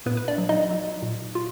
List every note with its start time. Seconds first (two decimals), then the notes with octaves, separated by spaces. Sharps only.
0.06 A#2 B3 B4
0.17 B4
0.28 D4 D5
0.38 F#3
0.49 D#4 D#5
0.71 F#3
1.02 A#2
1.35 F4